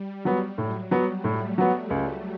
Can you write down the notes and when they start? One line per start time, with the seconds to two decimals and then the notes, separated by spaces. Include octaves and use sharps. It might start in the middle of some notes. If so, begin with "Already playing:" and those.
Already playing: G3
0.25 F#3 B3
0.58 A2 F#3
0.91 F#3 G3 B3
1.24 A2 A3
1.58 F#3 B3
1.90 C#2